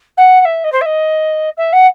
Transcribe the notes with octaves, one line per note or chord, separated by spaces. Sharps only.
F#5
F#5
E5
D#5
C5
E5
D#5
E5
F#5